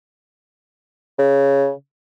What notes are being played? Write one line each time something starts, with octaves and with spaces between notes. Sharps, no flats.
C#3